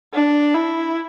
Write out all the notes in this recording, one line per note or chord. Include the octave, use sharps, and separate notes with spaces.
D4
E4